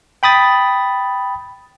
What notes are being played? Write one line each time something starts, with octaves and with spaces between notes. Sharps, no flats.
G5 B5 D#6 A6